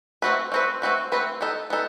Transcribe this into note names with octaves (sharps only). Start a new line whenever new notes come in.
A3 C4 F#4 B4
A3 C4 F#4 B4
A3 C4 F#4 B4
A3 C4 F#4 B4
B3 D#4 A4
B3 D#4 A4